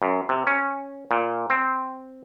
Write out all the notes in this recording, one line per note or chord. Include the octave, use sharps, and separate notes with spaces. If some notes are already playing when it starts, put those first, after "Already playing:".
F#2
C3
C#4
A#2
C4